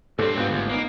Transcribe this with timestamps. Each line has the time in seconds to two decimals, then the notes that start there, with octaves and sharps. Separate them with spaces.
0.19 C#2 G2 C4 A4
0.37 G#2 B3 F4 B4 G6
0.50 G#1 D2 D3
0.69 A#3 B3 D#4